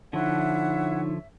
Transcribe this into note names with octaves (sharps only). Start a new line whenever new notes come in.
D3 F3 D#4 E4 C#5 E5 F#5